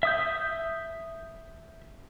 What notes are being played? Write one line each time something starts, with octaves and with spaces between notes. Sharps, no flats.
E5 D#6 G6